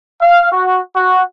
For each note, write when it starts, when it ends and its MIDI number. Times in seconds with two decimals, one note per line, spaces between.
0.21 0.48 77
0.52 0.80 66
0.96 1.24 66